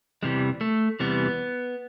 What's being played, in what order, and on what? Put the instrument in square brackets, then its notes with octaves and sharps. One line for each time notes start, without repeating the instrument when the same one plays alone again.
[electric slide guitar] E2 C3 E3 G3 G#3
A3
E2 C3 E3 G3 B3